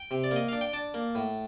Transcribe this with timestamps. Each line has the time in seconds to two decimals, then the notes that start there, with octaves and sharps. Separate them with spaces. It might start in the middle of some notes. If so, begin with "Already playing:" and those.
Already playing: G5
0.11 C3
0.24 D5
0.31 A#3 D#5
0.48 D4 F5
0.61 G5
0.73 D4 A5
0.94 A#3
1.15 A2